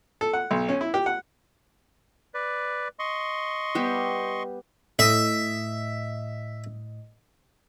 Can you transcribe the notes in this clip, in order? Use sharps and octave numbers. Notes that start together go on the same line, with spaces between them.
A4
F#5
B1
C#4
E4
G4
F#5
B4 D5
D#5 C6 C#6
G3 B3 G4
A2 D#5 E5